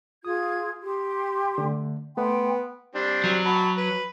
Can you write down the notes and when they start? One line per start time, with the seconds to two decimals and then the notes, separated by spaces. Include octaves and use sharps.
0.25 F4 G#4 D#6 G#6
0.83 G4 C6
1.58 D3 A3
2.17 A3 B3 G5 C6
2.95 G3 C4 D4
3.24 F#3
3.46 F#4 A5 B5
3.77 B4